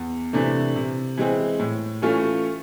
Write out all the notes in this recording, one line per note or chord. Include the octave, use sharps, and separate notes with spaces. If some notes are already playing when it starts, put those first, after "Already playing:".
Already playing: E2
C3 E3 A3 D4
C3
E3 G#3 C4
A2
E3 A3 C#4 F4